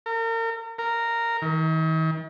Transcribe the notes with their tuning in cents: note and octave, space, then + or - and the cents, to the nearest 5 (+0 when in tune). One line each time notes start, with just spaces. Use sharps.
A#4 -40
A#4 -10
D#3 +45